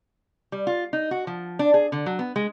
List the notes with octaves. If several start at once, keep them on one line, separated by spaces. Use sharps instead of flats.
G3
F4
D#4
F#4
F3
D4
G#4
D3
F#3
B3
G#3